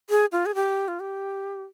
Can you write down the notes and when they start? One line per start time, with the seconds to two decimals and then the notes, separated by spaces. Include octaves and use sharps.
0.10 G#4
0.32 F4
0.46 G#4
0.55 G4
0.88 F4
1.00 G4